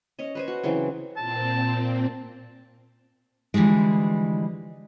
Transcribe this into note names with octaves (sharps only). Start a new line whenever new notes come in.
C#4 C#5 D#5
B4 C5 G#5
F#4
C#3 E3 F#3 C4
A#2 C4 A5
D3 E3 F3 G3 G#3